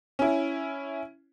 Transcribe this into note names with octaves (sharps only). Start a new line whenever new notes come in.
C#4 E4